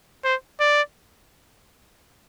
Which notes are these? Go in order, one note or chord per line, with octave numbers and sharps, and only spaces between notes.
C5
D5